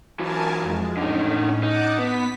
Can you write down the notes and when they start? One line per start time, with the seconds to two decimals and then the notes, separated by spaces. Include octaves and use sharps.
0.19 E3 F#3 A#4 G#5 A5
0.62 F2 G#3
0.97 A2 D3 C#4 D#4
1.63 D#4 F#5 A5 D6
1.99 B3 B6